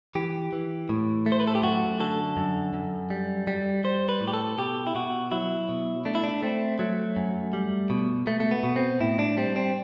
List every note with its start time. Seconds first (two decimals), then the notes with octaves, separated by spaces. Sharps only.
0.15 E3 G4
0.53 E3
0.89 A2
1.26 A3
1.32 C5
1.40 B4
1.47 A4
1.55 G4
1.62 F#2 F#4
2.00 D3 A4
2.37 F#2
2.74 F#2
3.10 G3
3.47 G3
3.84 G3 C5
4.09 B4
4.21 A2
4.27 G4
4.34 A4
4.58 B2 G4
4.87 E4
4.95 B2 F#4
5.32 F#3 E4
5.69 B2
6.05 A3 D4
6.15 E4
6.24 D4
6.43 A3 C4
6.79 F#3 A3
7.16 F#2
7.53 G3
7.90 B2
8.27 B2 A3
8.40 A3
8.51 B3
8.64 B2
8.76 C4
9.00 A2 E4
9.19 D4
9.37 G3 C4
9.56 C4